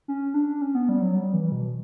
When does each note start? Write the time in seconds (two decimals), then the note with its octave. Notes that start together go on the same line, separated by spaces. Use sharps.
0.08 C#4
0.34 D4
0.61 C#4
0.75 B3
0.89 G3
1.01 F#3
1.15 G3
1.34 E3
1.52 B2